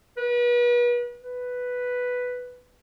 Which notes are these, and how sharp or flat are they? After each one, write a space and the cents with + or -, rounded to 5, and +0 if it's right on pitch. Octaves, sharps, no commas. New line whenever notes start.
B4 -35
B4 +0